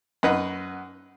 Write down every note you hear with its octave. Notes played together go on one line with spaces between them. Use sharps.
F#2 D#4 B4 F#5